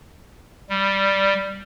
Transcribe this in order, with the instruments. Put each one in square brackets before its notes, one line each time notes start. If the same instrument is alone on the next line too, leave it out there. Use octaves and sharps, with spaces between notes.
[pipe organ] G3